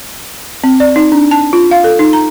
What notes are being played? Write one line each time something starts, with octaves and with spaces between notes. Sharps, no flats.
C4
D5
D#4
D4
A5
F4
F5
A4
D#4
A#5